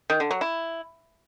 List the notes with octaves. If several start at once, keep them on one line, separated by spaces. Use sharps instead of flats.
D#3
D3
F#3
E4